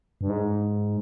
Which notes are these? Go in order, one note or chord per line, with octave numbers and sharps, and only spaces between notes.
G2
G#2